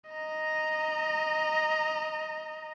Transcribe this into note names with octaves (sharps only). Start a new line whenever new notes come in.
D#5 A#5